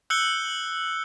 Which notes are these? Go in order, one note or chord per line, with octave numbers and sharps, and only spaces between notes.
E6 F#6 G6 C#7 F#7 G7